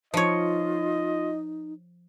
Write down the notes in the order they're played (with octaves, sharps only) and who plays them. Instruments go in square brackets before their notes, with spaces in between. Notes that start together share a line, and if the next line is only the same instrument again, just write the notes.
[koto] F3 C#5 [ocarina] D#4 [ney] F4 [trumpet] D#5